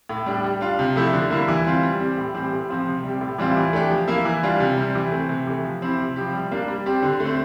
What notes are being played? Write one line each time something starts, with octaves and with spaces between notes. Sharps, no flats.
A2
G3 D4 G4
G3
D4 F4
C3
F3 A3 E4
D3
G3 A#3 E4
E3
G3 C4 F4
G3
C4 G4
A2
E3 G3 C4 G4
A2
F3 C4 F4
C3
G3 C4 G4
A2
E3 G3 C4 F4
E3
A3 D4 G4
F3
A#3 E4
E3
G3 D4 F4
C3
G3 C4
E3
A3 C4
C3
E3 A3
F3
C4 E4 G4
C3
F3 C4 E4 G4
G3
A#3 D4 G4
G3
C4 G4
D3
A3
C4